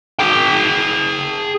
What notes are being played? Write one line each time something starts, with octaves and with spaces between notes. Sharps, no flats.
G#4 G5